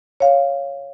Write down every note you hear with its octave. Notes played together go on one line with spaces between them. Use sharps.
C#5 F5